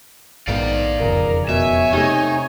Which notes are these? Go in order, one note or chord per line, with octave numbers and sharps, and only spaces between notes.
A#1 G#2 D#3 B3 C5 D5 F5
E1 F2 C#3 A#4
B2 C#5 E5 G#5
C3 A3 D#4